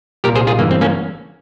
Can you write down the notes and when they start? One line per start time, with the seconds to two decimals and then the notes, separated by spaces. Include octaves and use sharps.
0.24 C2 A#2 G3 A#3 G4 A#4
0.35 G#4 C5
0.47 F4 G#4
0.59 G1 G2 E3 G#3 A#3
0.71 C4
0.81 A#3 C#4